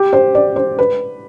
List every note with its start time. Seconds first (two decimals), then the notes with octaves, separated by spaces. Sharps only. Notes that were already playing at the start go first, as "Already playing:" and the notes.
Already playing: G4
0.13 C5
0.35 D5
0.56 C5
0.79 B4